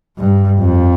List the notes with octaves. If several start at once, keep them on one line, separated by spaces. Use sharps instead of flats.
G2
F2